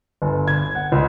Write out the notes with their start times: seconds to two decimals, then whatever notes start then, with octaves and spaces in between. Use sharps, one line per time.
0.22 G1
0.48 G#6
0.75 F#5
0.92 C#2